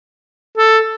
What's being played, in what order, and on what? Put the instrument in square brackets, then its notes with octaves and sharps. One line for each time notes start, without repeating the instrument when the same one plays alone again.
[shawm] A4